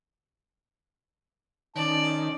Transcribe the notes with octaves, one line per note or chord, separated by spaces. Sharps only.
D#3 C#4 D5 A5